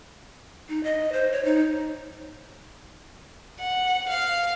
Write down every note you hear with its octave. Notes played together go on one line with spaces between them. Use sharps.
D#4
D#5
C5
C#5
D#4
F#5
F5